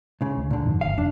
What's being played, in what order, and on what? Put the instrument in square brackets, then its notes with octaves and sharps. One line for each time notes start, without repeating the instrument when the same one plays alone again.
[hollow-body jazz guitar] C#2 C#3
[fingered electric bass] D2
[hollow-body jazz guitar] A#2 D3
[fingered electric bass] F2 G#2 D#3
[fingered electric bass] G1 [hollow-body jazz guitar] F5
[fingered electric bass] F1 F#2 [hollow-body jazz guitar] D4